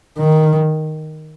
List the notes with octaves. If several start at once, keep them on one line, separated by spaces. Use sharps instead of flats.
D#3